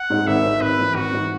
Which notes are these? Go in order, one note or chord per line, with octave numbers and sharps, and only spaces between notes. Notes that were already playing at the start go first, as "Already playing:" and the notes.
Already playing: F#5
G#2 G#3
G#1 E5
G#2 G#3
G#1 B4
G#2 E3
G#1 F#4
G#2 E3